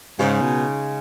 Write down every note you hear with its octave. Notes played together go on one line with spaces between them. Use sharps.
G#2 C#3 G#3 D#4
B2